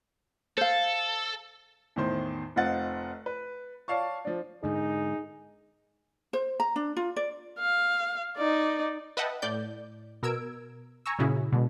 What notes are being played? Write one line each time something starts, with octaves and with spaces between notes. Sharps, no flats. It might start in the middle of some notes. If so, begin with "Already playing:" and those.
A4 C5 F5
E2 A2 D#3 C5 C6
F1 C4 F4 D#5 F#5 A6
B4
C#5 D5 F5 A5 C#6
F3 D4
G#2 D3 D#4 G#4
C5
A#5
D4
F4
D5
F5
D#4 D5
B4 D#5 E5 F#5 G5 A5
A2 D5 G6
B2 A#4 E6 G#6 D7
G#5 A#5 C#6 E6
A#2 C#3 C#4 E4 F#4 G#4
B2 D3 G#3